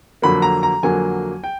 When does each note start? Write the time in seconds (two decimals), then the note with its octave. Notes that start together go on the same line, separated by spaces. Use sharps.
0.22 F2 D3 F#3 A#3 B5
0.42 A#5
0.63 A#5
0.83 F2 D3 F#3 A#3 G#5
1.44 G5